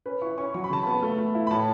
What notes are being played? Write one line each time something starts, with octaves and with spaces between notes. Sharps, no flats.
C#4 B4
E4 C#6
C#4 C#6
F#3 C#6
B5
C#3 A5
B3 B5
A3
A3
E4
B5
A2 A5